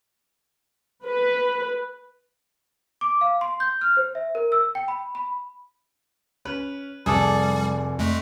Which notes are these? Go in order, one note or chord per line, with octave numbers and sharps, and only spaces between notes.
B4
D6
F5
C6
G6
F6
C5
E5
A#4
E6
G5
B5
B5
C#4 B4
F1 G3 G#4 A4 D5
F2 G#3 A3